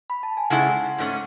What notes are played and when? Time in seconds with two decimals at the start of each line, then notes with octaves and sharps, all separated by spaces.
0.10 B5
0.23 A5
0.37 G#5
0.50 C#3 G#3 C#4 E4 A4 F#5
0.98 G#2 F#3 A3 C#4